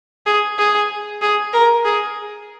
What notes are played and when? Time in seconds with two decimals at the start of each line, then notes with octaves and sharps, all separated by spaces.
0.26 G#4
0.58 G#4
1.22 G#4
1.53 A#4
1.85 G#4